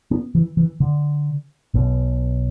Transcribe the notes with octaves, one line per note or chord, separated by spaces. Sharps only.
B3
E3
E3
D3
B1 B2